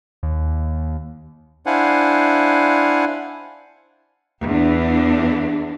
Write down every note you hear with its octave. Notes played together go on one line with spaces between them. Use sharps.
D#2
D4 E4 C5 F5 F#5 G#5
E2 D4